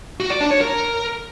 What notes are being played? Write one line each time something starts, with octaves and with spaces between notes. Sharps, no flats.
F#4
D5
D4
C#5
A#4